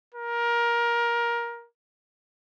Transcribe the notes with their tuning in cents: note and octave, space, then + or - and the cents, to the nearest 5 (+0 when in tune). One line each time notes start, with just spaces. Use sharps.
A#4 +20